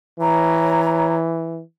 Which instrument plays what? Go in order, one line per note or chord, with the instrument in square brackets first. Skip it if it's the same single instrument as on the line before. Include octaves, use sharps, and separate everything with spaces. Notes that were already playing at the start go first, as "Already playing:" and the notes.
[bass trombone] E3 [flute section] C#5 A#5